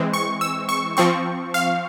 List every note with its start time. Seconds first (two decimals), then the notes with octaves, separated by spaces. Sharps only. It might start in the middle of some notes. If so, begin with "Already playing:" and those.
Already playing: E3 G#3 C4
0.13 C#6
0.41 E6
0.69 C#6
0.97 F3 C4 C#6
1.54 F5